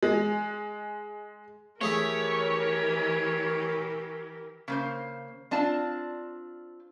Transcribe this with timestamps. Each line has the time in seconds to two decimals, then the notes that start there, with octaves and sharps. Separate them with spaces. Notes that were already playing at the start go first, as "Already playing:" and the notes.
0.03 G#3
1.81 E3 A3 G4 G#4 A#4 C#5 E5
4.68 C#3 A#3 C5
5.51 C4 D4 F4 A5